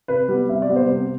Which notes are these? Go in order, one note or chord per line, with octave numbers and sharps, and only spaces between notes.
C3 B4
G3 B3
C3 E5
D5
G3 B3
C5
C3